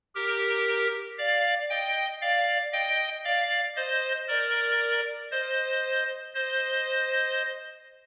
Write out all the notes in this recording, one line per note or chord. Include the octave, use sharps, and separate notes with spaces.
G4 A#4
D5 F5
D#5 G5
D5 F5
D#5 G5
D5 F5
C5 D#5
A#4 D5
C5 D#5
C5 D#5